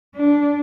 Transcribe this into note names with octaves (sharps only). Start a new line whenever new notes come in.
D4